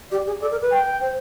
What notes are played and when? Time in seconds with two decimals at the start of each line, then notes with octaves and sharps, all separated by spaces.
0.12 G4 D5
0.27 G#4
0.41 A4 D5
0.51 A#4
0.62 B4
0.72 G5
1.01 C5